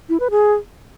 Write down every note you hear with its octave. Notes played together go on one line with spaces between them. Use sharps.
E4
B4
G#4